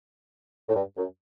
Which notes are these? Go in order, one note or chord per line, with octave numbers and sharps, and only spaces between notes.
A2
G2
F#2